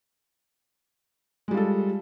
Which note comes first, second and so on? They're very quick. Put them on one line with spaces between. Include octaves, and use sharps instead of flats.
G#3 G3 F4 A4